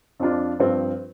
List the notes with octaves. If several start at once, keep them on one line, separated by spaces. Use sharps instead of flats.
F2 F3 D4 F4
G2 F3 C4